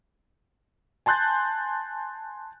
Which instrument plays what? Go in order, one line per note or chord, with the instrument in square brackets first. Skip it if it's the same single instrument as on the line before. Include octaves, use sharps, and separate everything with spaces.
[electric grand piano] G#5 A5 C6 F#6 G6 A6